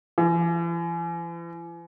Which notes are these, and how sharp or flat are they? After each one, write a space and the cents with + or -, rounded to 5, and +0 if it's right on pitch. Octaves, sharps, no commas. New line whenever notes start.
E3 +45